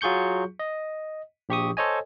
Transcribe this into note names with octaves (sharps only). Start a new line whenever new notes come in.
F#3 F4 G#4 C#6 G6 C#7
D#5
A#1 G4 C#6 D#6
A4 C5 C#5 D#5 G#5